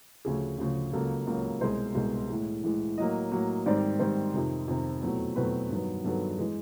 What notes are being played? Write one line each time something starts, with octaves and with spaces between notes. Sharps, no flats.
D2 C#3 F3 G#4
D2 C#3 F3
C#2 C#3 F#3 A#3 A4
C#2 C#3 F#3 A#3
C2 B2 G#3 C5
C2 B2 G#3
A2 E3 G#3
A2 E3 G#3
A2 F#3 A#3 D#5
A2 F#3 A#3
G#2 D#3 G3 C4 D5
D5
G#2 D#3 G3 C4 C5
F2 C3 D#3
F2 C3 D#3
E2 B2 F#3 A3 C4
E2 B2 F#3 A3 C4 B4
G2 D#3 F#3 B3
G2 D#3 F#3 B3 A4
E3 G#3